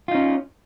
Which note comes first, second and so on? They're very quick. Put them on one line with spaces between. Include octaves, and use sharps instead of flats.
F4 D#4 C#4